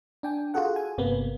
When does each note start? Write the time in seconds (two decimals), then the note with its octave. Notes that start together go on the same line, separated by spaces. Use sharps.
0.23 D4 G5 G#5
0.54 F4 F#4 G#4 A4 F#5
0.76 G#5
0.98 G1 C3 A#3 B3